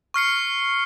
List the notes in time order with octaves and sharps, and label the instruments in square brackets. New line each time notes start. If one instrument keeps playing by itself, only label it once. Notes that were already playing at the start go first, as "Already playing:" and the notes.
[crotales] C#6 F6 C7 C#7